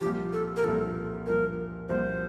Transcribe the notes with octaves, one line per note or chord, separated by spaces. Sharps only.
C2 A#2 F3 G4
A4
A#4
C2 A#2 F3 A4
C2 A#2 F3 A#4
C2 A#2 F3 C5